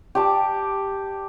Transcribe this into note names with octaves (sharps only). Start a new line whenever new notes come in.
G4 D5 A5 D6